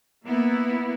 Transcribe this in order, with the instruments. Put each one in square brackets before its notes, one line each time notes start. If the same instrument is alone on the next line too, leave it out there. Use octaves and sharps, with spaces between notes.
[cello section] A#3 B3 E4